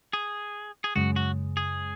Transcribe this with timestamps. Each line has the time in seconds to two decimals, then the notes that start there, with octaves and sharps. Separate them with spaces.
0.13 G#4
0.84 G#4
0.96 F#2 C#3 G#3 F#4
1.16 F#4
1.57 G#4